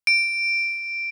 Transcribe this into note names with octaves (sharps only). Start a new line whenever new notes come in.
D7